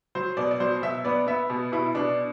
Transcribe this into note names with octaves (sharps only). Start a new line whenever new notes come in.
F#3 C5
B2 D5
D5
F#3 C5
B2 E5
B3 D5
B3 E5
B2
B2 E4
B2 D4